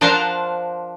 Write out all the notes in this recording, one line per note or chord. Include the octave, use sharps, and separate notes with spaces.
F3 D4 A#4 C5 F5 F#5